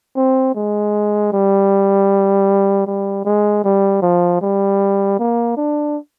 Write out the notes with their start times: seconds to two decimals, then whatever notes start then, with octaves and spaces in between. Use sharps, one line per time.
0.16 C4
0.55 G#3
1.32 G3
2.87 G3
3.25 G#3
3.64 G3
4.02 F3
4.41 G3
5.19 A#3
5.57 D4